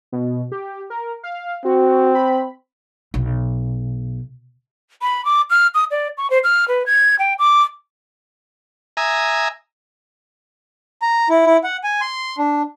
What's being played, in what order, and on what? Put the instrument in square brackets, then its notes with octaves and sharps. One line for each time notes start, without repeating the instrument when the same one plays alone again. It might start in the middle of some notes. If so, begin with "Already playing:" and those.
[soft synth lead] B2
G4
A#4
F5
[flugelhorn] C4 [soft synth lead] F#4
[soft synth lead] B5
[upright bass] B1
[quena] B5
D6
F6
D#6
D5
C#6
C5
F6
B4
G#6
G5
D6
[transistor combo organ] E5 G#5 A#5 D#6
[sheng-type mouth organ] A#5
E4
E4
F#5
G#5
C6
D4